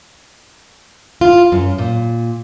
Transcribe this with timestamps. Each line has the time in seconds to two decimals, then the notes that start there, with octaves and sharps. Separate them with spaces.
1.21 F4
1.52 F#2
1.78 A#2